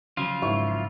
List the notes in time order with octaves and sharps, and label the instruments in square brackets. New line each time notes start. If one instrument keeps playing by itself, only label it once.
[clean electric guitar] C#3 F3 F#3 [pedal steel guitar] F4
[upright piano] G#1 E4 C#6